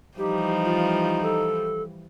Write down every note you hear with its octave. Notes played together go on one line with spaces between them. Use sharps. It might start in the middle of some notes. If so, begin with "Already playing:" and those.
E3 F3 G3 D#4 G4
F4
A4